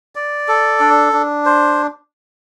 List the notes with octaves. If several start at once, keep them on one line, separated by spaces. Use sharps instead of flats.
D5
A4
D4
D4
C5